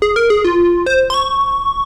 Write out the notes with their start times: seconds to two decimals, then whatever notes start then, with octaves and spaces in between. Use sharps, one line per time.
0.02 G#4
0.16 A#4
0.30 G#4
0.45 F4
0.86 C5
1.10 C6
1.14 C#6